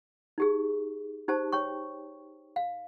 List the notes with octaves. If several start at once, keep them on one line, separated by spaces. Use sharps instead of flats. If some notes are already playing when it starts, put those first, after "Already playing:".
D#4 G4 G#4
D#4 G4 C5 A5
C#5 G5 C#6
F5